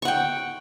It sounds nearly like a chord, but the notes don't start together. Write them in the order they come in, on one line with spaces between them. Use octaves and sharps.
C#6 F#5 G5